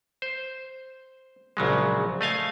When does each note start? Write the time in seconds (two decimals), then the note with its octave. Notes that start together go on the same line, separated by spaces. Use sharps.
0.22 C5
1.57 A#1 C#3 F#3 G#3
2.21 A3 D#5 F5 G#5